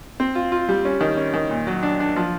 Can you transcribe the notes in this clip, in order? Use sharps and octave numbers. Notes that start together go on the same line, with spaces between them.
C4
F4
F4
G3
C#4
D#3
C#4
D#3
A#2
F#3
D4
D4
F3